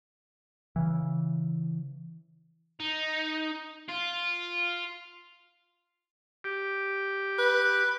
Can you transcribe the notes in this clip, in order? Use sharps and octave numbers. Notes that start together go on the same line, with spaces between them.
C#3 E3
D#4
F4
G4
B4